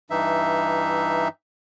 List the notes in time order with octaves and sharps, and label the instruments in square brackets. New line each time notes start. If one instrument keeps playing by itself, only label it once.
[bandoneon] G2 E3 D#4 E5